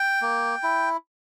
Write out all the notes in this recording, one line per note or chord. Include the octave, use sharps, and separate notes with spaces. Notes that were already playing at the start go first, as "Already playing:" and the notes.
Already playing: G5
A#3
E4